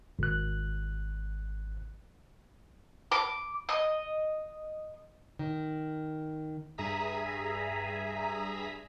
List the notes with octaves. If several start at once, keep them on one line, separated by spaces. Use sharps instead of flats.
G#1 F#6
D6
D#5
D#3
G2 G#4 E5 A#5 D#6 B6